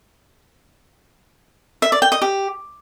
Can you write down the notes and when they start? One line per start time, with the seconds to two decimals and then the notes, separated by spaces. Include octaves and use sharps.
1.82 E5
1.92 D5
2.02 G5
2.12 D#5
2.22 G4